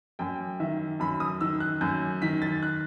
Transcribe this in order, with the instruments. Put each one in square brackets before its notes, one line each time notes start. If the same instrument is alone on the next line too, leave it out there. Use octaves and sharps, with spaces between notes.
[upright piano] F#2 G5
D#3 E5
F#2 B5
D#6
D#3 E6
F#6
F#2 G6
D#3 B6
A6
F#6